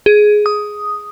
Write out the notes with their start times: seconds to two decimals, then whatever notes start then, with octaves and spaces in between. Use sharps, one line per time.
0.06 G#4
0.46 D#6